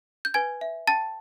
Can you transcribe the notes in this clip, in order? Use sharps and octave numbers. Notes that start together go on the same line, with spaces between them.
G6
B4 G#5 G#6
E5
G5 A5 A6